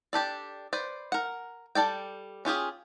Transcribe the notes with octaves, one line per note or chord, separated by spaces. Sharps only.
D4 G4 A4 D5
B4 C5 D5
A#4 F#5
G3 A4 D5 G5
C#4 F4 G4 G#4